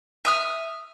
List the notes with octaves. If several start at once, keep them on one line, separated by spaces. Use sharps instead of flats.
E5 D#6 F6